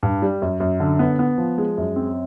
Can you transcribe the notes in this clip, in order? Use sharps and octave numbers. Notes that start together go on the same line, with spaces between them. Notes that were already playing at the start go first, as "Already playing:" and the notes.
G2
G3
F#2
F#2
D3
B3
B3
F3
G#3
F#2
C4